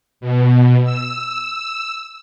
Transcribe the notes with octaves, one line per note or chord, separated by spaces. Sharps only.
B2
E6